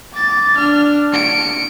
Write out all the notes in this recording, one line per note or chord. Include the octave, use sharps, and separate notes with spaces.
D6 A6
D4 F6
C#7 D7